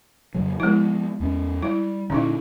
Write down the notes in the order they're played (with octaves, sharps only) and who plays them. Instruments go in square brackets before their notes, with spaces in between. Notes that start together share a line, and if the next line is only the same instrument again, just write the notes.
[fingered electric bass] F2 C#3 F#3
[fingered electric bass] F3 B3 [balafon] G#3 E4
[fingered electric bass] E2 C#4
[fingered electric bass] G3 [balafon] E4
[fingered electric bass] A#2 D3 [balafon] C#4 D#4 E4